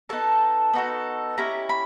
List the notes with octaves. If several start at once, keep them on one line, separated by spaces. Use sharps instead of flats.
B3 D#4 F#4 A4 A5
B3 D#4 F#4 A4
C#4 E4 G4 A#5
B5